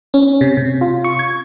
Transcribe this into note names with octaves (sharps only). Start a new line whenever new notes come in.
C#4
C3
C3
F4
C#6
G#6